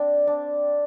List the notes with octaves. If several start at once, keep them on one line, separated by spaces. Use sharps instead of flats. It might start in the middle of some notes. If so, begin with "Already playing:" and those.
Already playing: C4 D4
D4